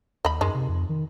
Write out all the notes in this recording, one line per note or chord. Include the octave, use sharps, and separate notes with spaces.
D#2 D#5 B5
F#2 D#3 G#3
C3
F2
D#3